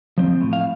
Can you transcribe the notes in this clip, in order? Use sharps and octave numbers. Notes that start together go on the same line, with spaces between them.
F3 C4
A2
F5